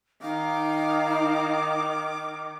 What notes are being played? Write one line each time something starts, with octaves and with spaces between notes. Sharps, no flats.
D#3 D#4 F5 D6